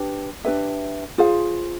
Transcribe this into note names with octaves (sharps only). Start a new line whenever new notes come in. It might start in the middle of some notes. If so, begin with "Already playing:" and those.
Already playing: D4 G4 B4
D4 G4 B4 E5
F4 G#4 C5 F5